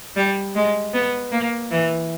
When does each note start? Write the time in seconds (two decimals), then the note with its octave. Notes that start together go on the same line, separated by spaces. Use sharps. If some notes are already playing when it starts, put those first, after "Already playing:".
0.16 G3
0.55 G#3
0.94 B3
1.32 A#3
1.71 E3